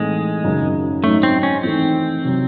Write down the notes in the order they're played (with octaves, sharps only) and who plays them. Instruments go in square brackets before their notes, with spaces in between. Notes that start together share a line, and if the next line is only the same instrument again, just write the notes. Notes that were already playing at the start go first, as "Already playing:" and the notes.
Already playing: [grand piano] A2 E3 A3 C4 D#4 [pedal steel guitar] G#3
[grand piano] G#1 F#2 C#3
[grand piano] G#2 F#3 C#4 [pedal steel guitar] A3
[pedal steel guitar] C4
C#4
[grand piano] G#1 G#2 E3 A3 D#4 [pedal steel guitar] C4
[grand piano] C3 F#3